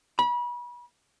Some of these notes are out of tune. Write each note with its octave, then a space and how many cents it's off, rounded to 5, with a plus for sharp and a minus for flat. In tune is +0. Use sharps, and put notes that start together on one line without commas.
B5 -35